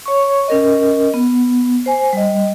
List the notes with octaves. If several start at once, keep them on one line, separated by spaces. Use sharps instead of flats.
C#5 C#6
C#4 A#4 D#5
B3
C5 G#5
G3 D#5